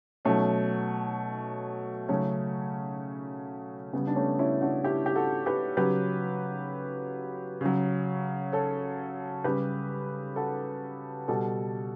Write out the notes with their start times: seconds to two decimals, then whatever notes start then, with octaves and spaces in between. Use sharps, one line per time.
0.25 B2 F#3 A3 C#4
2.09 C#3 F#3 A3 C#4
3.93 C#3 G3 B3
4.07 D4
4.16 A3 C#4
4.39 C#4 E4
4.61 D4 F#4
4.84 E4 G4
5.06 G4
5.16 F#4 A4
5.46 G4 B4
5.77 C#3 F#3 G4 B4
7.61 C#3 F#3
8.52 A4 C#5
9.44 C#3 G3 G4 B4
10.36 F#4 A4
11.28 B2 G3 F#4 A4